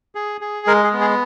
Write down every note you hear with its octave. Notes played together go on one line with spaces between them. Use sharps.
G#4
G#4
G#3 A#4
G#4
B3
G#4